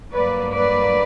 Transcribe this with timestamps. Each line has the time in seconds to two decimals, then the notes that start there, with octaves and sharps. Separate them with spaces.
0.12 G2 F#3 A#3 B4 D5
0.53 B4 D5